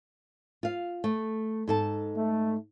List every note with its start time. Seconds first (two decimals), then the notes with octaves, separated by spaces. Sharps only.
0.63 F4 F5
1.04 A3
1.68 G#2 A4 A5
2.16 A3